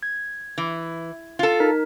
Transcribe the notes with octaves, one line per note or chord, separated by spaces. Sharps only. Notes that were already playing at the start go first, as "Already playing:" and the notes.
G#6
E3
F4 A4
D#4 A#4